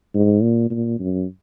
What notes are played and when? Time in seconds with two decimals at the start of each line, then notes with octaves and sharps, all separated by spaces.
0.15 G#2
0.42 A#2
0.70 A#2
0.99 F#2